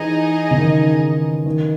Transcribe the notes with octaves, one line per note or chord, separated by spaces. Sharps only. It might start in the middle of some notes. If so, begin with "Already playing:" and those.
Already playing: E3 D#4 G#4 D#5
C#3
D#3
D#3